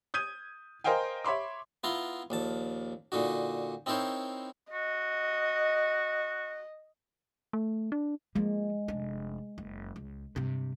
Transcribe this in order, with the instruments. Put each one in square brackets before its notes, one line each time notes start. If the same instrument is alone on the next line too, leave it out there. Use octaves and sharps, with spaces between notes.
[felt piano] D#6 G6 G#6 D#7
A#4 C5 D#5 F5 G5 G#5
C#5 E5 B5 C6 D6
[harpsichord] B3 E4 F4 A#5 C6
A#1 D#2 A5
A#2 D3 D#4 F#4
C4 D#4 E4 A#4 C5 C#5
[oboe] F#4 [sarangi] D#5
[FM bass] A3
D4
[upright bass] F3 A#3 [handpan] G#3
[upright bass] F1 D4
F#1
C#2
G2 C3